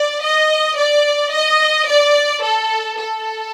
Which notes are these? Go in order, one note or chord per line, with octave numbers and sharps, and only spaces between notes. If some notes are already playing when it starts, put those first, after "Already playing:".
Already playing: D5
D#5
D5
D#5
D5
A4
A4